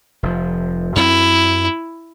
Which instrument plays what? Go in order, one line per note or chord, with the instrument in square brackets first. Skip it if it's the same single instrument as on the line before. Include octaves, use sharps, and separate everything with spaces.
[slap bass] F1 F3
[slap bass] F#2 C4 [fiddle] E4